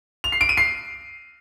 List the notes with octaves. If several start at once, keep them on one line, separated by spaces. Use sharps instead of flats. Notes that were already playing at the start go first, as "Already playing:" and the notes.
F7
C7
D7
D#7
C7